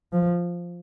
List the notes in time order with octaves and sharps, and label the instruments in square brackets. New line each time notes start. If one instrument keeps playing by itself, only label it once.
[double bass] F3